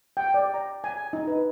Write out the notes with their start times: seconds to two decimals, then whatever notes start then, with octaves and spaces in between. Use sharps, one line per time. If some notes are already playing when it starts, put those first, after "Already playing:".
0.17 G5
0.34 D5
0.54 A#5
0.84 G#5
1.13 D#4
1.28 B4